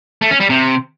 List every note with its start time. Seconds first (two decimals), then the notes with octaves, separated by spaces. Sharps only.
0.21 A3
0.31 C#4
0.40 G3
0.49 C3